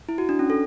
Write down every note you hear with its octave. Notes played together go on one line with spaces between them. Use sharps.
E4
F#4
D4
C#4
A4